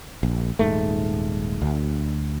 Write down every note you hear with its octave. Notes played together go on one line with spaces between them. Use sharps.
A#1
D#1 G#2 A3
D2